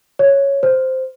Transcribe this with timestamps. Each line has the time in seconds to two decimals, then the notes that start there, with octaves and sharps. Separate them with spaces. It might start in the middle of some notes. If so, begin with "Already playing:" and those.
0.19 C#5
0.63 C5